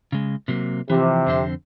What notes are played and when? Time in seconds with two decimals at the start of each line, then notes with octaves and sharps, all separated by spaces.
0.12 C#3 G#3
0.48 C3 F#3 A#3
0.90 C3 E3 F3
1.26 F2 D3 C4